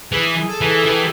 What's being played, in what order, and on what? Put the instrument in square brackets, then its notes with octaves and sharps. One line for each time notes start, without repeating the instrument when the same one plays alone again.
[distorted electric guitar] E3 [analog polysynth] G#4
[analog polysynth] A4
[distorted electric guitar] E3
[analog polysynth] G#4
[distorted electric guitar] E3 [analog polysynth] G4